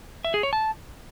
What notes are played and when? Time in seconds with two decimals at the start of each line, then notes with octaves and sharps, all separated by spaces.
0.25 E5
0.34 G#4
0.43 C#5
0.53 A5